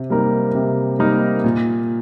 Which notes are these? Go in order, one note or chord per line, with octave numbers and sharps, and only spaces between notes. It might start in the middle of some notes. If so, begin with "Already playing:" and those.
Already playing: C3
G3 A#3 D#4 A#4
C3
G3 A#3 D#4 A#4
A#2